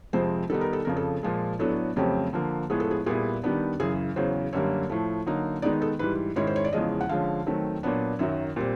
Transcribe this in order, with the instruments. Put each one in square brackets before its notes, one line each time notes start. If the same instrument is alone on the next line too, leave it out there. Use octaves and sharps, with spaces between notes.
[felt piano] F2 C3 F3 G#3 C4 C5
D#3 G3 B3 D#4 A4
A#4
A4
F2 C#3 F3 A#4
A4
A#2 F3 G#3
A2 F#3 B3 D4 A4
F2 C#3 F#3 A3 C4 G4
D3 F3 A#3
A2 F3 G#3 B3 G#4
A4
G#4
A#2 G3 B3 E4 G#4
D#3 G3 B3 D4
F#2 C#3 E3 G#4
E2 C#3 F#3 C5
F#2 D3 G3 A#3 C#5
A2 F3 A3
D3 F#3 A#3 D#4
D#3 G#3 B3 D#4 D5
A4
G#2 E3 G3 B4
G#2 D#3 G#3 C#4 E4 C#5
C5
C#5
D5
E2 C#3 F3 G#3 C#4 D#5
F#5
D3 F3 G#3 C#4 F5
D#3 F#3 A3 C4
A#2 F#3 B3 D4
F#2 D#3 F#3 E5
A#2 G3 C4